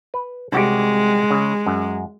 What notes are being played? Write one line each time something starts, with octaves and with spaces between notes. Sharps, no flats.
B4
C2 G#3 F#4 G4
C#3
F#2